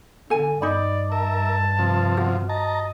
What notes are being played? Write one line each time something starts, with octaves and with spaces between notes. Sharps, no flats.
D3 A4 G#5
G2 D#4 D5 B5
A#4 E5 A5
C3 F3
F#4
D#5 A5 A#5